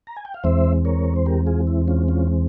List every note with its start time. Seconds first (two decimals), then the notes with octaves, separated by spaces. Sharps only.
0.07 A#5
0.17 G#5
0.25 G5
0.34 F5
0.44 E2 E3 G#3 C4 C5 E5
0.85 A#4 C#5
1.16 C5
1.26 G4 A#4
1.47 F4 G#4
1.67 E4
1.88 C#4 F4
2.08 C#4 F4